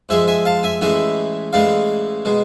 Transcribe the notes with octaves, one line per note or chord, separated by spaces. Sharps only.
G#2 F3 G#3 E5 G#5
E5 G#5
F5 A5
E5 G#5
A1 A2 E3 G#3 E5 G#5
A1 A2 E3 G#3 D5 F5
B2 G#3